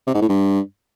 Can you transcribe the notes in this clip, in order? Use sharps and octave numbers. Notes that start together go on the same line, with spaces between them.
C3
G#2
A2
G2